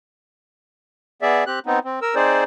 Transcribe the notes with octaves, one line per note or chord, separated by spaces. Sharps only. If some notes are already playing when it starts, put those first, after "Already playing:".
B3 G#4 D5 E5
C4 G4 F#6
B3 C4 D#4
C4
A#4 E6
C4 D#4 G#4 C5 D5